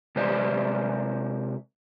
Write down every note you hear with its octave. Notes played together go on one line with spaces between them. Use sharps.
C3 G#3 B4 C5 D5